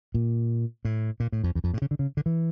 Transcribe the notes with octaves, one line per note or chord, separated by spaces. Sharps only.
A#2
A2
A#2
A2
F2
E2
F2
A2
C#3
D3
C#3
D3
E3